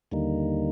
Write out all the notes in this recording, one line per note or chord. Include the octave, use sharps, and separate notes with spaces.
D#2 D3 G3 A#3 D#4